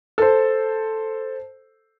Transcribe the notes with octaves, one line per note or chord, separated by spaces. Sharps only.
A4 C5